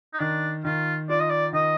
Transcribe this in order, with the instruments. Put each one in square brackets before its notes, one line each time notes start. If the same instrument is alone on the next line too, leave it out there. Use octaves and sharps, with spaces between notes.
[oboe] D#4
[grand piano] D#3 [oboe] D4
[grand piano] D#3 [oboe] F4
[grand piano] F4 [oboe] D5
[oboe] D#5
D5
[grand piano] D#3 [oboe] D#5